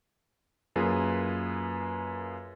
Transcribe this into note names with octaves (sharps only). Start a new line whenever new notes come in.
F#2 A#3 F4 G#4 B4